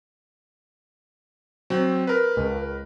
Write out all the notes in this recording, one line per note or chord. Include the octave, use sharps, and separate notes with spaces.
F#3 C4
A#4 B4
C#2